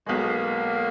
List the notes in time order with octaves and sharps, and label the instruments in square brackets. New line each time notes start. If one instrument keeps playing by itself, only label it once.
[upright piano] B1 B2 G#3 [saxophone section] A#3